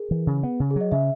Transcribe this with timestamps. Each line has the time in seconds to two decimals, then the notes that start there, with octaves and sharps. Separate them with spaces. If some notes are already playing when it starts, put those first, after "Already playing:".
Already playing: G#4 A#4
0.11 E3
0.27 C#3
0.43 B3
0.60 C#3
0.71 G#4
0.76 F#3 D#5
0.92 C#3 E5